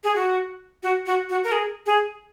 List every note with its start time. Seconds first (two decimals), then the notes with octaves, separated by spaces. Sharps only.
0.04 G#4
0.15 F#4
0.83 F#4
1.06 F#4
1.30 F#4
1.44 A#4
1.52 G#4
1.86 G#4